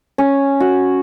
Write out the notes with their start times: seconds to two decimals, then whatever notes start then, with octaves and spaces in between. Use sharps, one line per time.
0.18 C#4
0.60 F#4